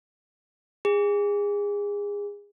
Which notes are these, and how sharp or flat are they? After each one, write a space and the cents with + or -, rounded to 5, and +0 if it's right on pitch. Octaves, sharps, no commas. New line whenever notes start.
G#4 -25